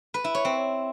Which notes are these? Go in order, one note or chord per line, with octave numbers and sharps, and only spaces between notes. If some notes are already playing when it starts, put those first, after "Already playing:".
B4
E4
C#5
C4